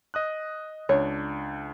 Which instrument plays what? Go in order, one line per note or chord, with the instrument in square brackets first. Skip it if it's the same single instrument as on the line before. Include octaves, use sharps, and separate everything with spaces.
[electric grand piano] D#5 D#6 F#6
[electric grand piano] C#2 D4 [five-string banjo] C#5